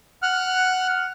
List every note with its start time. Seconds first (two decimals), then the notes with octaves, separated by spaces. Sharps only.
0.22 F#5 F6 F#6